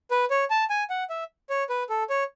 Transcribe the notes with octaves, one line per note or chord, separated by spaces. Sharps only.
B4
C#5
A5
G#5
F#5
E5
C#5
B4
A4
C#5